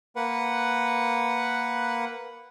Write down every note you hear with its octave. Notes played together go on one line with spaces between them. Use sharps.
A#3 B4 F#5